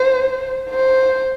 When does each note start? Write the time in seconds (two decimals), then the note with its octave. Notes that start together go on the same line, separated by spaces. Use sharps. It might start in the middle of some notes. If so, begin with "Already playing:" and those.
Already playing: C5
0.70 C5